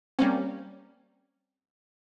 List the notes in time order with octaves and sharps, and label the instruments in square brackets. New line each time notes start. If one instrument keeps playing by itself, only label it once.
[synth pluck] G3 A#3 C#4 [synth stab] C4